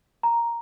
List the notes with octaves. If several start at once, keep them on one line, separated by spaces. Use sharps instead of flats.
A#5